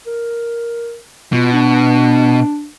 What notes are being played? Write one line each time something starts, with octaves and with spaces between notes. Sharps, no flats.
A#4
B2 F4
D4